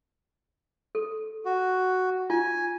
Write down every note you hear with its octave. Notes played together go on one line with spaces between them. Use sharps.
A4
F#4
F4 G#5